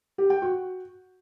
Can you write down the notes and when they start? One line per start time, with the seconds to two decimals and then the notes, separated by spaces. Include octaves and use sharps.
0.18 G4
0.30 G5
0.42 F#4